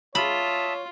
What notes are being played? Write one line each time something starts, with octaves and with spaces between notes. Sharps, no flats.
F4 C#5 E5 A5 B5 D#6